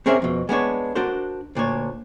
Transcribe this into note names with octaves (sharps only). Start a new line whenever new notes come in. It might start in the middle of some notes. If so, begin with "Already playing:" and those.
C4 C#4 G#4 A#4 D5 E5
F2 B2
G#3 B3 D4 C#5
D4 F#4 A#4 C5
D2 A#2 D4 C#5